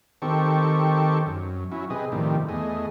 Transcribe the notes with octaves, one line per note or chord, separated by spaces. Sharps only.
D#3 C4 G4 A4 C#6
F#2
F#3 C#4 E4
C3 G#4 B4 D#5
A2 C3 D#3 F3 G3
E2 A3 G#4 D#5